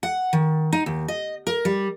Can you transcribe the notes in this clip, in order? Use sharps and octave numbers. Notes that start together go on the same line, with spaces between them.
F#5
D#3
D#4
D#2
D#5
A#4
G3